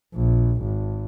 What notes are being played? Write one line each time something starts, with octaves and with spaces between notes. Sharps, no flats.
A#1
G#1